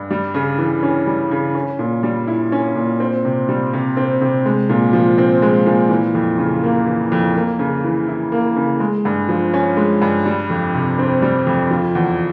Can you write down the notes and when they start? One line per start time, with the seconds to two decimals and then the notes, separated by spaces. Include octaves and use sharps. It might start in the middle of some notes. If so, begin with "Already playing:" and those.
Already playing: G2
0.11 G3
0.34 C#3
0.58 E3
0.83 C#4
1.07 G3
1.31 C#3
1.55 C#4
1.79 A#2
2.03 G3
2.27 E4
2.52 C#4
2.75 A#2
3.00 C4
3.25 C3
3.49 G3
3.73 C3
3.97 C4
4.21 C3
4.46 G#3
4.69 A#2
4.93 F3
5.18 C4
5.42 G#3
5.66 A#2
5.90 E3
6.15 F2
6.38 C#3
6.63 A#3
6.87 E3
7.12 F2
7.36 A#3
7.59 C#3
7.84 E3
8.08 E4
8.32 A#3
8.56 C#3
8.80 G#3
9.05 G2
9.29 F3
9.54 C#4
9.77 G#3
10.02 G2
10.26 G3
10.50 F2
10.74 C3
10.99 C4
11.22 G3
11.47 F2
11.71 F3
11.95 E2